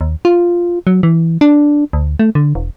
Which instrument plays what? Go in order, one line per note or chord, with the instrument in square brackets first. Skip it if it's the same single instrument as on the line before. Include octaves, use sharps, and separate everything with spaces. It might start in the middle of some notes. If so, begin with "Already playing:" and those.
[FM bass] D#2
F4
F#3
E3
D4
D2
A3
D3
E1